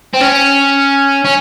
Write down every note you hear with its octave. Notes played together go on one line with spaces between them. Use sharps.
C4
C#4
C#4